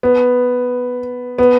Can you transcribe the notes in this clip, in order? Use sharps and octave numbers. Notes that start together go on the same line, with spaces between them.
B3
B3